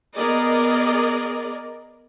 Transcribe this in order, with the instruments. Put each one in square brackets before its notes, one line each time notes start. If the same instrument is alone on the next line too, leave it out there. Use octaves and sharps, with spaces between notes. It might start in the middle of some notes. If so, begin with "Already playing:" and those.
[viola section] B3 G#4 A#4 D5 D#5